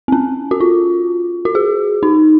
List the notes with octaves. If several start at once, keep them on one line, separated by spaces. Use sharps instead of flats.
C4
C#4
F#4
F4
F#4
G#4
D#4